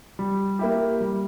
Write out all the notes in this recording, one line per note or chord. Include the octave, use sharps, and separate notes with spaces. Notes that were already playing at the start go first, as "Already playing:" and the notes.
G3
A#3 E4 G4
G3